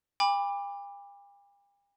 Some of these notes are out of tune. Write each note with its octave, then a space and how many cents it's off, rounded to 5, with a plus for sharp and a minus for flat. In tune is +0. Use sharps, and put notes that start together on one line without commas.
G5 +45 B5 +0 D6 +0